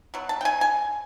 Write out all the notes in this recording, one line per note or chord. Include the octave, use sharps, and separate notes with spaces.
B2 F#3
A5
G5
G#5
G#5